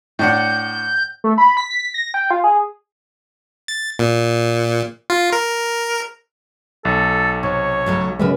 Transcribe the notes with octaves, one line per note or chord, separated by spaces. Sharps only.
A2 D4 F#5 G6
A3
B5
B6
B6
A#6
G5
F4
G#4
A6
A#2
F4
A#4
B1 A4
C3 C#5
C#3 F#3 A3
C#3 F#3 G#3 A#4 B4 E5